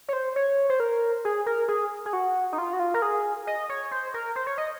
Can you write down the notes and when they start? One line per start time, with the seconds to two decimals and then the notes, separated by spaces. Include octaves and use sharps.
0.08 C#5
0.13 C5
0.36 C#5
0.70 C5
0.80 A#4
1.25 G#4
1.46 A#4
1.68 G#4
2.06 G#4
2.13 F#4
2.53 D#4
2.58 F4
2.73 F#4
2.80 F4
2.94 A#4
3.02 G#4
3.47 D#5
3.69 C#5
3.91 C5
4.14 A#4
4.36 C5
4.47 C#5
4.58 D#5